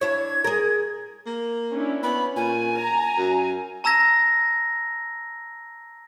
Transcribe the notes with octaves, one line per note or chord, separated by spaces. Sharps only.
D4 E4 C#5 G#6
G#4 A#4
A#3
C#4 D4 E4
B3 C#4 B5
A#2 G#5
A#5
F#2
A5 A#5 E6 G#6 A#6